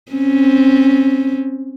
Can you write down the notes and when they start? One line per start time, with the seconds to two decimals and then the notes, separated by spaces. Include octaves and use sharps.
0.12 C4 C#4